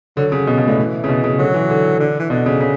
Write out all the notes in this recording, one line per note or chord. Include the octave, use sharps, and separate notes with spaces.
D3 F#3
C#3
B2
B2
A2 D3
E3
C#3
B2
C#3
D3 F#3
E3
D3
D3
E3
B2 D3
C#3
C#3